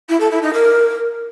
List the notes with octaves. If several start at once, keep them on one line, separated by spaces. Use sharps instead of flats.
E4
A4
E4
D#4
A#4